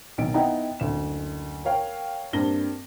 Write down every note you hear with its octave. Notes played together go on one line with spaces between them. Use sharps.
B1 D#3 D7
B3 D#4 E4 F#5 G5 A#5
F#1 D2 E7
A#4 C#5 F5 G5
G2 A#3 C4 A#6 G7